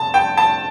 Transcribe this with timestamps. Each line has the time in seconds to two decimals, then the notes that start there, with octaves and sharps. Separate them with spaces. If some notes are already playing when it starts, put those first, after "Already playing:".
Already playing: F1 A5
0.14 G5
0.37 A5